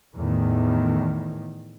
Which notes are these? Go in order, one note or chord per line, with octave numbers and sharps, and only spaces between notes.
E2 A2 D#3